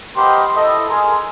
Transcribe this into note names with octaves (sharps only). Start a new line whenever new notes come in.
B3 G4 A#4 C5 D#5 C6
E4 A4 D#5
G#4 A#4 C6